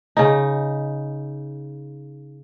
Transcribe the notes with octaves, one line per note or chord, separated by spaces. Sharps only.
C#3 D#4